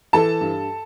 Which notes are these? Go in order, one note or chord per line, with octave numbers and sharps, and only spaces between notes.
E3 A4 A5
G2